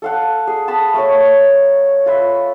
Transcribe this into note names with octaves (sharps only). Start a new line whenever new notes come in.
A4 F5 F#5
G#4
A5 B5 D#6
A3 A#4 C#5
F4 B4 E5